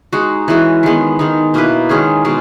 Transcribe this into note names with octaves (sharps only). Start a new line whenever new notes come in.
G#3 D#4 F#4
E3 G#3 C#4 F#4
D#3 G#3 B3
D#3 G#3 D#4
B2 A#3 E4 B4
D#3 G#3 C#4 G#4
B2 G#3 C#4